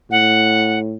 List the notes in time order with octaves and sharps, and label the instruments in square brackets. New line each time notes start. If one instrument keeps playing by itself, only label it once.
[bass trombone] A2 [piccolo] F#5